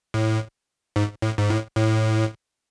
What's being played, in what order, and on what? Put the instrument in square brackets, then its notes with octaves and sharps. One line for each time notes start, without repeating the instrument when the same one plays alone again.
[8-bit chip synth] A2
G#2
A2
G#2
A2
A2